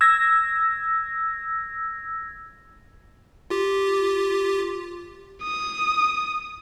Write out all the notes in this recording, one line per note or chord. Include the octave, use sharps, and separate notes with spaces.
E6 G#6 A#6
F4 G4
D#6